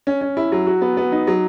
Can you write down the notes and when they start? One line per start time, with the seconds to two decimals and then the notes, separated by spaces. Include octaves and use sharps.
0.07 C#4
0.21 C#4
0.37 E4
0.52 F#3
0.67 F#4
0.82 B3
0.97 B3
1.12 D#4
1.27 F#3